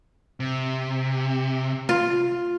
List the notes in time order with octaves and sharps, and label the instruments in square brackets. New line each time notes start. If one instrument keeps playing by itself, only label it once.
[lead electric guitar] C3
[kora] F4